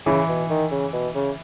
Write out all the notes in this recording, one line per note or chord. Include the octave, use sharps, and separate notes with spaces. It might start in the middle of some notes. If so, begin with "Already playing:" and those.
C#3 E3
B2
D#3
C#3
B2
C#3